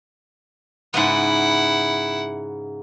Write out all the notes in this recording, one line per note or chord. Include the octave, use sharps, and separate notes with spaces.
G#2 C#3 B3 E4 F#5